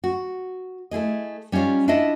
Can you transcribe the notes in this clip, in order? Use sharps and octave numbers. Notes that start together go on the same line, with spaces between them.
F#4
A3 E4 G#4 D#5
G3 C#4 D#4 F4 C#5
D4 E4 F4 A4 D#5 E5